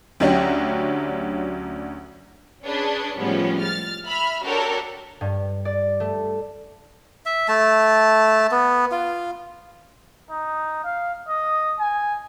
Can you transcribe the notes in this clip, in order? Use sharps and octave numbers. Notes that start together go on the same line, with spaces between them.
D2 F#3 C#4 D4 G4
C#4 D4 G#4 B4
A2 F3 G3 G#3 B3 C#4
F6 A6
E5 B5 F6
D4 F#4 G4 A4 A#4 C#5
G2
D5
A3
E5
A3 A5
B3
F4
D#4
F5
D#5
G#5